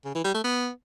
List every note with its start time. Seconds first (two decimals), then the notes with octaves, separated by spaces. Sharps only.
0.05 C#3
0.15 E3
0.24 G3
0.34 A3
0.44 B3